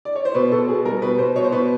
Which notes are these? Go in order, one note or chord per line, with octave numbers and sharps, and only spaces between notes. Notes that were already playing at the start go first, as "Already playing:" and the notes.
D5
C#5
C5
B2 B4
B2 A4
B2 G#4
G3 A#4
B2 B4
B2 C5
B2 C#5
C5
B2 B4